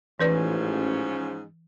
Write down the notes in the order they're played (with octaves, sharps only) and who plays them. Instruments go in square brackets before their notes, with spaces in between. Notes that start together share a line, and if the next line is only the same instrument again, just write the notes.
[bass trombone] A1 [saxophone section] G#2 F3 C#4 [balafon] E3 B4 D5